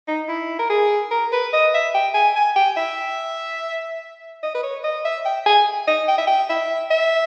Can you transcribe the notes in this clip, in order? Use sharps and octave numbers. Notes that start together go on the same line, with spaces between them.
D#4
E4
A#4
G#4
A#4
B4
D#5
E5
G5
G#5
G#5
G5
E5
D#5
B4
C#5
D#5
E5
G5
G#5
D#5
G5
E5
G5
E5
E5